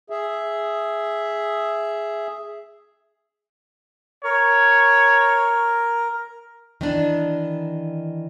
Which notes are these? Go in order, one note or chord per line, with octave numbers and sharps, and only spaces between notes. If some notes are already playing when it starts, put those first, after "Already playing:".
G#4 E5
A#4 C#5
D#3 E3 D4